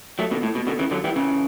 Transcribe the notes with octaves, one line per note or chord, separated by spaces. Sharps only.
F#3 A3
B2 D3
A2
B2
B2 D3
C#3 E3
D3 F#3
E3 G3
C#3 E3